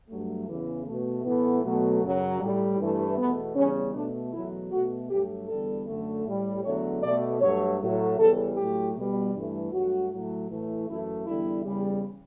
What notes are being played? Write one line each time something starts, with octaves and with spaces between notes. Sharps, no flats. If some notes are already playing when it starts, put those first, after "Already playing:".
G2 F#3 A3
E2 C#3 E3
B2 A3
A2 E3 A3 B3
B2 F#3 A3
F#2 C#3 F#3
A2 G3
G2 E3 A3
E2 B2 A3 B3
E2 C#3 G3 C#4
B2 A3 D4
E2 B2 F#3 A3 E4
B2 A3 F#4
G2 F#3 A3 G4
E2 D3 G3 A4
F#2 D3 A3
A2 G3
E2 D3 F#3 A3 C#5
B2 A3 D5
G2 F#3 A3 C#5
A2 F#3 A3
E2 C#3 E3 G3 A4
A2 F#3 A3 G4
B2 G3
G2 E3 A3
G2 F#3 A3 F#4
A2 F#3 A3
A2 E3 A3
F#2 E3 A3 E4
E2 D3 G3 E4
E2 C#3 G3